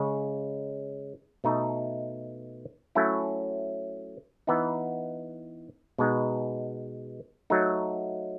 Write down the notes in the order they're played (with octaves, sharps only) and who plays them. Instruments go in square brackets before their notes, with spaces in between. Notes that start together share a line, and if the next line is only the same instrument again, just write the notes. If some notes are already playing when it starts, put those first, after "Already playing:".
Already playing: [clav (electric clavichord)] C#3 G#3 C#4
B2 A3 D#4
F#3 A3 C#4 E4
E3 B3 D#4
B2 G#3 B3 D#4
F#3 A3 D#4